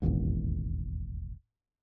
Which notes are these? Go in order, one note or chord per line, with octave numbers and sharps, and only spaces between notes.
E1 A1 D#2 G#2